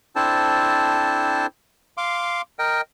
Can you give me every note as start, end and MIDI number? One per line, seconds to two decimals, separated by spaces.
0.16 1.46 60
0.16 1.46 62
0.16 1.46 64
0.16 1.46 69
0.16 1.46 72
0.16 1.46 81
1.97 2.42 77
1.97 2.42 84
1.97 2.42 86
2.59 2.81 70
2.59 2.81 75
2.59 2.81 79